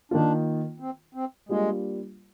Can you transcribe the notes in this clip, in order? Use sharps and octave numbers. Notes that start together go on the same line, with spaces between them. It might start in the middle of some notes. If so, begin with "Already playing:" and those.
D#3 A#3 D4 F4
C4
C4
G3 G#3 A#3 D4 F4